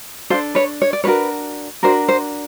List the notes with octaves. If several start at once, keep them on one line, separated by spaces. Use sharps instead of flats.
D4 F4 A4 C5
B4 C#5
C#5
D5
D4 F#4 A#4 B4 C#5
D4 F#4 A#4 C5
C5